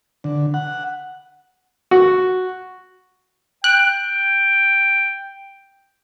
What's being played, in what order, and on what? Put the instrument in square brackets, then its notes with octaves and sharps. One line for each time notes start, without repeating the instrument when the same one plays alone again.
[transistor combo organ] D3
F#5
[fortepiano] F#4
[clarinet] G5 [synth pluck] F#6